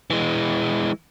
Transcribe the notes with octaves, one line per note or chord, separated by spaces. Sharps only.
E3 G#3